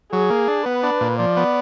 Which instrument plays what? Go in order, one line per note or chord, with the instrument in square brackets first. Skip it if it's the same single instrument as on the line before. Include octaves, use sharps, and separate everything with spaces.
[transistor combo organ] F#3 [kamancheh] G#4
[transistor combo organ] A#3
D4
[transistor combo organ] B3 [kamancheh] B4
[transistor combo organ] D4
A#2
[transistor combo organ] F3 [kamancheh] D5
[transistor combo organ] B3